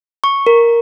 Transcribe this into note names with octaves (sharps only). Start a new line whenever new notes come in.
C#6
A#4